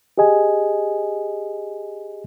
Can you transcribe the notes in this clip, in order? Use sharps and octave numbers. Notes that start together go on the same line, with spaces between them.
G4 G#4 D#5 G#5